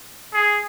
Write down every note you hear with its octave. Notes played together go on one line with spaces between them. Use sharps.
G#4